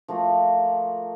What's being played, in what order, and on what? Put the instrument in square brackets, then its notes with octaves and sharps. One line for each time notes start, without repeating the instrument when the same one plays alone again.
[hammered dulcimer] F3 A3 A#3 F#4